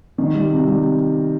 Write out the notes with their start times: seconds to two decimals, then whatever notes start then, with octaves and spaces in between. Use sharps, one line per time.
0.18 D#3
0.35 G3
0.51 C3
0.67 G3